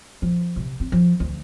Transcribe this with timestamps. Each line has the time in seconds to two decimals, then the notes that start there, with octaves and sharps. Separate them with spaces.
0.22 F3
0.56 C3
0.80 C4
0.92 F3
1.20 D2